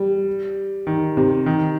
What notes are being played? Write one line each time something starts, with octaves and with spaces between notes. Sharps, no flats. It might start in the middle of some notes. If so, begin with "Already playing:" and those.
Already playing: G3
D#3
C3
D#3